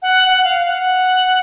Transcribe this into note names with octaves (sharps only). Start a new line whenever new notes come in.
F#5
F#5
F#5
F5
F#5